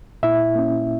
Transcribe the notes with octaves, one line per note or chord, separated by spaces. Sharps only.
A#2 E4 E5
A#3 C#4